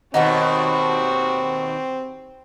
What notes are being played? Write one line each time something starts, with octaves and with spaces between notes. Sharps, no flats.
D#2 B2 C4 D#4 F#4 G4 F#5 C#6